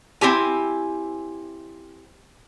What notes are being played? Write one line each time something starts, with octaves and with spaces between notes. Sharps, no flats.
C4 E4 G4 G#5